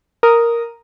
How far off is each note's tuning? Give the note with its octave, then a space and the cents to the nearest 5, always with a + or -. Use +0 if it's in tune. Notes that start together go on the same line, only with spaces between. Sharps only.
A#4 +0 D#6 +0